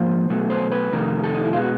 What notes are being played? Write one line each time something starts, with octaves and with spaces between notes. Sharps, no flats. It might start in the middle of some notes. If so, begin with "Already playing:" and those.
Already playing: G#2 F3 A#3 C5
B2 F#3 A3
C5
B4
F2 C3 D#3 A3 A#4
A4
D#4
E4
B2 G#3 B3 F4
F#4